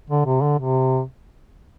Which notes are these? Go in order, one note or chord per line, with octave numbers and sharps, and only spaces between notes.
D3
C3
D3
C3